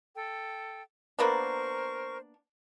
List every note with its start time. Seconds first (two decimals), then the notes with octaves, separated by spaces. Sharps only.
0.15 A4 G5
1.19 A#3 B3 D4 A#4 C5 C#6